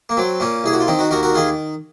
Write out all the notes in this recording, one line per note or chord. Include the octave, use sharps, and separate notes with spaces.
A#3
F#3 C4
A#2 A#3 C#4
C2 G#4
F#4
F4
D#3 C4 D#4
D#4 F#4
D#2 F#4 A#4
F#4 A#4
D#3 F4 G#4